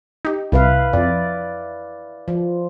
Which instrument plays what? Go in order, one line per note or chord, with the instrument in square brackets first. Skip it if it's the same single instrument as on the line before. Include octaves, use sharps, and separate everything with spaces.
[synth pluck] D#4 G4
[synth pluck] C2 [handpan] E4 B4 F5
[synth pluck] F2 [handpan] D5
[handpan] F3